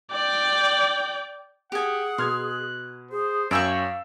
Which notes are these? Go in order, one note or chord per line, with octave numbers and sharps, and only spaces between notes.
D5 G5
G4 G#4 F#5 G#5
B2 C6 F6 F#6 G#6
G#4 C5
F#2 C#5 D5 F5 G5 G#5 C#6 E6